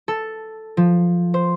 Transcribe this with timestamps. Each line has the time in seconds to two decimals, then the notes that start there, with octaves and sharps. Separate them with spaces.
0.08 A4
0.77 F3
1.34 C5